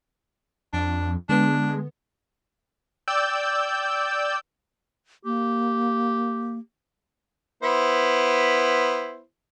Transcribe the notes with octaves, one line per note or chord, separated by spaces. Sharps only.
F2 D4
D3 G#3 B3 D4
D5 G5 E6 G6
A#3 G4
B3 E4 C5